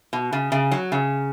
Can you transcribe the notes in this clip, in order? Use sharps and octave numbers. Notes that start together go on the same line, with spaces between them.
B2
C#3
C#3
F#3
C#3